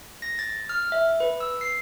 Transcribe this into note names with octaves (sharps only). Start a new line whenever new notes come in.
A#6
A6
F6
E5
B4
E6
C7